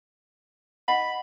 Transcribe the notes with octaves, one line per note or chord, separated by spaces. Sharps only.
D#5 F#5 B5